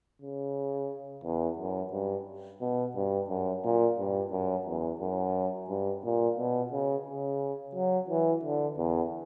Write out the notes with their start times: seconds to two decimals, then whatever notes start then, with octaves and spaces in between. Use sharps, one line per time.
0.22 C#3
1.24 E2
1.58 F#2
1.93 G2
2.61 B2
2.96 G2
3.29 F#2
3.64 A#2
3.98 G2
4.32 F#2
4.67 E2
5.01 F#2
5.69 G2
6.04 A#2
6.38 B2
6.72 C#3
7.06 C#3
7.75 F#3
8.09 E3
8.44 D3
8.78 E2